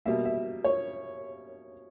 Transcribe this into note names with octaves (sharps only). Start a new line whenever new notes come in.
B2 G3 A#3 E5
E5
C#5